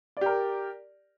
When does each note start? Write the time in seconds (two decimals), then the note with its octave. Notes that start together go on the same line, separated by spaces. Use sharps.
0.17 D5
0.21 G4
0.26 A#4